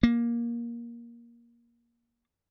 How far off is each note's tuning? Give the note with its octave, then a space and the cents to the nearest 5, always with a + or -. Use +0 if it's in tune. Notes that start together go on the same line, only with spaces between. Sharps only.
A#3 +15